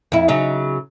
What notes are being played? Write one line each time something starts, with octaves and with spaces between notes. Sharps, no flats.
F2 E4
C#3 F#3 D#4